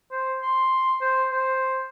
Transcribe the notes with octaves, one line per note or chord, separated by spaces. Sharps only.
C5
C6
C5
C5